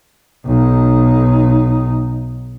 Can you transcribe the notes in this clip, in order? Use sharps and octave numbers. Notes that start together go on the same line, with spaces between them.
B1 D#4